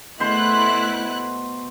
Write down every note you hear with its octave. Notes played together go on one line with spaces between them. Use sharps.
B2 A3 E4 C5 C6 F#6